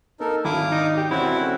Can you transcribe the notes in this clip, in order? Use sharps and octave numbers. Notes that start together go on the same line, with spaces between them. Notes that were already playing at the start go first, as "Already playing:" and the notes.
A#3 D#4 A4 A#4
G#1 D2 E4 F5 D6 D#6
D#4
G4
E1 C4 C#4 E4 F#4 D5
A3